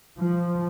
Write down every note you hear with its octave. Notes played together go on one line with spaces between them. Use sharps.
F3